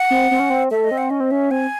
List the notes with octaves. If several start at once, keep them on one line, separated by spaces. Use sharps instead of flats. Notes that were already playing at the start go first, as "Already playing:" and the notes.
Already playing: F#5
C4
C4
C#4
C4
A3 E5
D#5
C4
F#5
C#4 D#5
C4
C#4 E5
C4 G#5